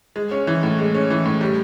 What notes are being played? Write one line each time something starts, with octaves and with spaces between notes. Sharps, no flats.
G#3
C#4
E3
A2
G#3
C#4
E3
A2
G3